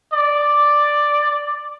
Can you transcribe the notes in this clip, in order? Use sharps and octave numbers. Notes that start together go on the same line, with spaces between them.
D5